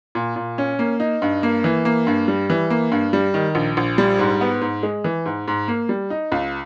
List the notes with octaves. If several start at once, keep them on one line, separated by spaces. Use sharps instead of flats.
A#2
A#2
C#4
A#3
D#4
G2
A#3
E3
A#3
G2
G3
E3
A#3
G2
G3
D#3
A#1
A#1
G3
G#2
B3
G#2
G#3
E3
G#2
G#2
A#3
G3
D#4
C#2